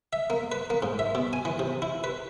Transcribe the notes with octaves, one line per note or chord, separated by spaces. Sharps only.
E5
A#3
B4
A#3
G#2
E5
B2
G#5
E3
C3
E4
B4